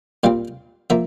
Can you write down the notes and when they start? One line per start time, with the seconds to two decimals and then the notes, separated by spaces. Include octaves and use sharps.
0.24 A#2 G3 C4 F5
0.90 F3 A#3 E5